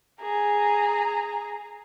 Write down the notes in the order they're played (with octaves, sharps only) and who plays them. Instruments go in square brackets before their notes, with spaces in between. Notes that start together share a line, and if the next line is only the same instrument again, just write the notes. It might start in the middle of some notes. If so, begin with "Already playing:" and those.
[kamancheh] G#4 A#5